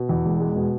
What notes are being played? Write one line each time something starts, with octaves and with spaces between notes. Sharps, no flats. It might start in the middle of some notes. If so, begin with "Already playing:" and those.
Already playing: B2
E2
E1
G#3
B2